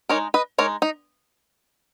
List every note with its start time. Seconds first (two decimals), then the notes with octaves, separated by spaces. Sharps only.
0.09 G#3 D#4 A#4 C#5
0.34 B4 D#5
0.58 G#3 D#4 A#4 C#5
0.82 D#4